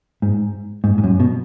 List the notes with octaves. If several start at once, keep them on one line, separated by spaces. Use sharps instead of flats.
G#2
G#2
G#2
F#2
B2